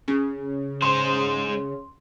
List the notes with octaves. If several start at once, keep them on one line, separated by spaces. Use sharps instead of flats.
C#3
G#3 C5 C6